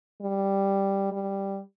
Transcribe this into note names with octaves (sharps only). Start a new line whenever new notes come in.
G3
G3